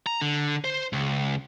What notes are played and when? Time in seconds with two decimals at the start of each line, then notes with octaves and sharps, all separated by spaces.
0.06 A#5
0.22 D3
0.64 C5
0.93 C#2